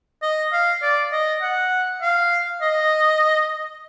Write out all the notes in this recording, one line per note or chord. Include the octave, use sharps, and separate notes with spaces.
D#5
F5
D5
D#5
F#5
F5
D#5